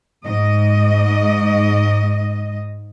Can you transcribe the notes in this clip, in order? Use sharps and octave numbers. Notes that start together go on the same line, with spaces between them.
G#2 D#5